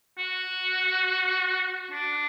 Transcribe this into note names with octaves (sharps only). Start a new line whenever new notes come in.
F#4
D4